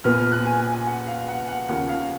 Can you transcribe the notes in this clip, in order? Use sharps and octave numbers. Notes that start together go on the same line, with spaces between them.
A#1 A#2 F3 B3 F6
F6
F#6
G#5
G#5
G#5
F#5
F5
F#5
F#5
D#2 C#3 F3 A#3 F#5
F5